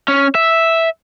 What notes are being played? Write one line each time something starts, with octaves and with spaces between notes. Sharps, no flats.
C#4
E5